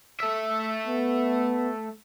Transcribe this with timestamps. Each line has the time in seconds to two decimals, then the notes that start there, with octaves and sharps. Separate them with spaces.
0.20 A3 E5
0.87 B3